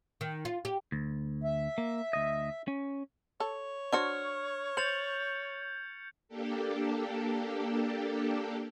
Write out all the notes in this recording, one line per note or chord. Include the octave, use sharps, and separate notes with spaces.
D#3
F4
G4
D2
E5
A#3
D2 D#5
C#4
A4 C#5
D4 F#4 C5 C#6 F6 G#6 C#7
C5 G6 A6 C#7 F7 F#7
A#3 D4 G4 A4